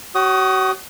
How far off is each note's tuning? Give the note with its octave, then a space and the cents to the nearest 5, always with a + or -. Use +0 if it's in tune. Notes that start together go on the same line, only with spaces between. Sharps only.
F#4 +35 C#5 +0 D#6 +0